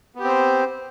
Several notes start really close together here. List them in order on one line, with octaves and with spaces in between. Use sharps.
B3 G4 C4 C5